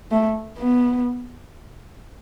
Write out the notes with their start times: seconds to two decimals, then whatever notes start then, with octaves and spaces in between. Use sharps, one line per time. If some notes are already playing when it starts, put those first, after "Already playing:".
0.11 A3
0.58 B3